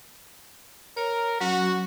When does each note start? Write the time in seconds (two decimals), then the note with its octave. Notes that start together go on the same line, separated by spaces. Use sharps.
0.97 A#4 C#5
1.40 F#3 C#4 F#4